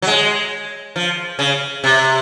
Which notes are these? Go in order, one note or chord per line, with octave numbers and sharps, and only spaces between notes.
F#3
G#3
F3
C#3
C3